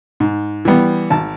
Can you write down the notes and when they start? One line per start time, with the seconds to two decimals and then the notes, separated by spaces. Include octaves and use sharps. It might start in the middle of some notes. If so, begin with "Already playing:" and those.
0.20 G#2
0.65 E3 G3 B3
1.10 G#1 A5